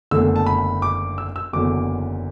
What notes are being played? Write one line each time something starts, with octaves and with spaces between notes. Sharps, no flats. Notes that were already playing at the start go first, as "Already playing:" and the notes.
F#1 E2 D3 A3 E6
A5
B5
D6
E6
E6
F#1 E2 D3 F#3 D6